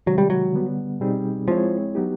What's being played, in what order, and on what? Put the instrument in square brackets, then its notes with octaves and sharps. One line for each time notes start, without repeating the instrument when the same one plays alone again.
[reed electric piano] C3 D#3 G#3 [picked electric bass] F#3
[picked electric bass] G3
F#3
[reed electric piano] D3 G3 B3
B2 G3 C4 D#4 G#4
[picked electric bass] F3 [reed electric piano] G#3 C4 E4 G#4 C#5
[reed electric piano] F#3 B3 D#4 G4